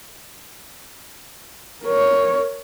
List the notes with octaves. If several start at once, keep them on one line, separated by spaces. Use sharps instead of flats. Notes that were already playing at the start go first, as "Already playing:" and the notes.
A#4 C#5